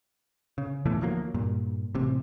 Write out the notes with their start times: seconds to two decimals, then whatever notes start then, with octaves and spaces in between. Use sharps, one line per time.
0.58 C#3
0.85 E1 B2 E3 A3
1.01 D2 F3 F#3 A#3
1.34 G2 A#2
1.95 A1 C3